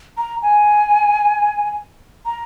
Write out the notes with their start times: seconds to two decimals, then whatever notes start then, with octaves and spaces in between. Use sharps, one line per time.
0.17 A#5
0.42 G#5
2.26 A#5